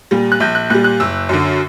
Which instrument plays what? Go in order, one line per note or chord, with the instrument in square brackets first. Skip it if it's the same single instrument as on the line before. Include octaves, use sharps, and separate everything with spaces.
[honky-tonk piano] A#2 G3
F#6
A#1 G6
F#6
A#2 G3 F#6
F#6
F#1 E6
F#2 D3